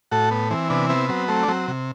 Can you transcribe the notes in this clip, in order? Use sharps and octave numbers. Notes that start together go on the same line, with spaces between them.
A2 F#4 A4
B3
E3 C4
C3 B3 D4
B3 C4 E4
F#3 C4
A3 C4
D4
F#3 C4
C3